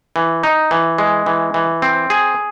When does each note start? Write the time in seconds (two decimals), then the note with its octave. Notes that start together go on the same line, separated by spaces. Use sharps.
0.16 E3
0.43 D#4
0.71 E3
0.98 G#3
1.26 E3
1.54 E3
1.82 C4
2.10 G#4